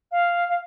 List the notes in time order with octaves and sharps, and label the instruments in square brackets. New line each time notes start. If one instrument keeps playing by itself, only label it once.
[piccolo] F5
F5